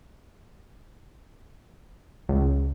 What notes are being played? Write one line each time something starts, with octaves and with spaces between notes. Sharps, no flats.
C#2